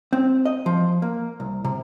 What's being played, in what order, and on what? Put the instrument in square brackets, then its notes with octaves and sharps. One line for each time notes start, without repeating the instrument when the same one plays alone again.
[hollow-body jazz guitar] C4
D#5
F3
A#3
C2
C3